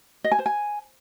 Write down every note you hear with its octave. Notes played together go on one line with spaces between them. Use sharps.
D#5
G#5
C5
G#5